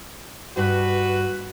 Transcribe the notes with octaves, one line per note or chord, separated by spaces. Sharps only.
G2 F#4 B4